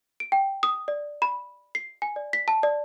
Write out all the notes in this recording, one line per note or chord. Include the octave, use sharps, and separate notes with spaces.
D7
G5
D#6
D5
B5
C7
G#5
D5
B6
A5
D5